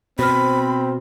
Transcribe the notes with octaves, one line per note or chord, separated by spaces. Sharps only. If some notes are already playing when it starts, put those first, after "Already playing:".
B2 C4 C5 B5 F6